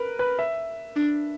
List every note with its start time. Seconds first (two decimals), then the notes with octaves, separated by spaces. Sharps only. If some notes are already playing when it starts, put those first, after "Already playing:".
Already playing: A#4 B4
0.19 B4
0.39 E5
0.96 D4